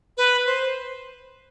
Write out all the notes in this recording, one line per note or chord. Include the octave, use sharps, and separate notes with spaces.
B4
C5